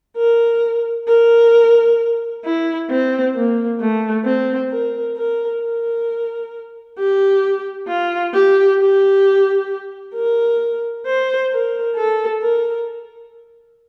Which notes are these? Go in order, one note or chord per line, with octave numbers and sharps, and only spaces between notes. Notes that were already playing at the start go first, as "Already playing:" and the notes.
A#4
A#4
E4
C4
A#3
A3
C4
A#4
A#4
A#4
G4
F4
G4
G4
A#4
C5
A#4
A4
A#4